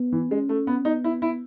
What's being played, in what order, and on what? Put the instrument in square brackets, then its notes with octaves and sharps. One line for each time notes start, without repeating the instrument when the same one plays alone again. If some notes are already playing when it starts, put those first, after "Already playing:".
Already playing: [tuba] B3
[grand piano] E3
[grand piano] G#3 [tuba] C#4
[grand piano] A3
B3
[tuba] B3 [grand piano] D#4
[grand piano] E4
E4